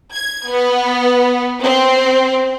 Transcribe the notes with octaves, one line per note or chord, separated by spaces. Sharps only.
G#6
B3
C4